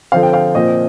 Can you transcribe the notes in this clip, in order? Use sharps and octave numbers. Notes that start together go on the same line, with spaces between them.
D3 F3 C4 F5
G5
F5
A#2 F3 C4 D#5